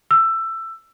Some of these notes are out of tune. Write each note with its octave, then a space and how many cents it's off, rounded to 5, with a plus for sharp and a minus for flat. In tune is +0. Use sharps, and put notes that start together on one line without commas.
E6 +15